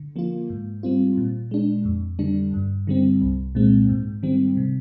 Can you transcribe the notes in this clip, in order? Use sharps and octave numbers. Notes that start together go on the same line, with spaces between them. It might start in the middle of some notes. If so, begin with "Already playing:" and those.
Already playing: D3
F3 A#3 F4
G#2
G3 C4 F4
A#2
G#3 D4
F2
D3 G3 D4
G2
D3 G3 C4
C2
A#2 G#3 C4
G#2
D#3 G3 C4
C3